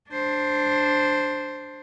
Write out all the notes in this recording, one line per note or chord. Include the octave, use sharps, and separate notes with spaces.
D4 C5